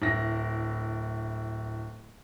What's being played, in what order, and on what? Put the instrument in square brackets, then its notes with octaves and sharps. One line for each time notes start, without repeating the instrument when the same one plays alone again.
[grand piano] D1 E4 A#6